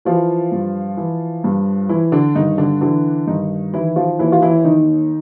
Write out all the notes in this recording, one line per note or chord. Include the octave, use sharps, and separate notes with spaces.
E3 F3 F4
G2
E3
G2
E3 E4
D3 D4
G2 D#3 D#4
D3 D4
D3 E3 D4
G2 D#3 D#4
D#3 E3 E4
F3 F4
D#2 E3 E4
F4
E3 E4
D#3 D#4